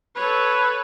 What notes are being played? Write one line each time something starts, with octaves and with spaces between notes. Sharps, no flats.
A4 B4 C#5